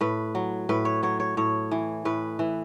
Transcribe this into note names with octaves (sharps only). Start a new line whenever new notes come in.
A2 B4
F#3
A2 B4
C#5
F#3 C#5
C#5
A2 C#5
E3
A2 B4
E3